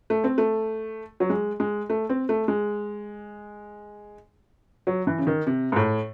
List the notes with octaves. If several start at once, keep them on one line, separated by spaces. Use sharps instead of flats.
A3
C4
A3
F#3
G#3
G#3
A3
C4
A3
G#3
F#3
E3
C#3
D#3
C3
G#2
A2